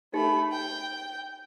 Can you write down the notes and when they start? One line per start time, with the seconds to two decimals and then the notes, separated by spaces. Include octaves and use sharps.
0.14 A3 D#4 G4 B5
0.52 G5